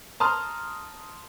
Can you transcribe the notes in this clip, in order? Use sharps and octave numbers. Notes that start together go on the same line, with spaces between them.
A5 A#5 C6 D#6 F6